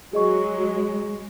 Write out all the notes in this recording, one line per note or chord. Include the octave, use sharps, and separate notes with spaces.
F#3 G#3 G#4 D#5 C#6